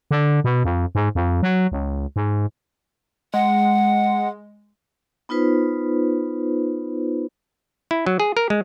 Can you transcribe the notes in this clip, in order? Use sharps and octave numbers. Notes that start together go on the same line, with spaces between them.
D3
B2
F2
G#2
F2
F#3
C#2
G#2
G#3 F#5
B3 D#4 F4 B4 C5
E4
F#3
G#4
A#4
G#3